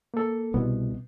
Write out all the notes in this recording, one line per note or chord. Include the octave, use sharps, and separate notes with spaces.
A#3 A4
C2 B2 B3